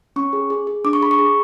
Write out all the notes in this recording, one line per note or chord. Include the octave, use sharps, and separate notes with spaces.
C#4 C#6
G#4
G#4
G#4
D4 D6
C#6
G#4 B5
C#6
G#4